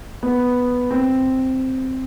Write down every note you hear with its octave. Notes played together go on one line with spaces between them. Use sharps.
B3
C4